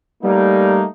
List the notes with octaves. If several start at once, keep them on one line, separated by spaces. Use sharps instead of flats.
G3 A3 A#3 D#4